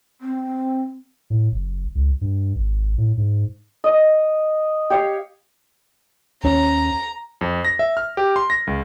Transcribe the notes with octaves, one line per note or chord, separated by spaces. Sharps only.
C4
A2
F#1
C#2
G2
G#1
A2
G#2
D#5
G4 C#5 F5
D#2 C#4 A#5
F2
A#6
E5
F6
G4
C6
A#6
C#2